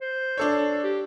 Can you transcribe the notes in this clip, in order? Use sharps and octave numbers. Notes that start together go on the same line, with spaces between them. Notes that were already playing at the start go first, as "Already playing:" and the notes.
C5
D4 A4 C#5
G4